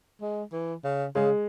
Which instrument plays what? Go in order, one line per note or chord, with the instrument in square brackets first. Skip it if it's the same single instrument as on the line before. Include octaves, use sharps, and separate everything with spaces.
[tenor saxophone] G#3
E3
C#3
[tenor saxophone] C#3 [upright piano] G#3